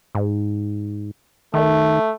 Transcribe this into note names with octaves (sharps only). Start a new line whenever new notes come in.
G#2
D#3 A3